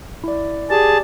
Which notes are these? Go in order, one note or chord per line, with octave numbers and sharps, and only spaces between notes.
E4 D5
G4 G#4 D5 A5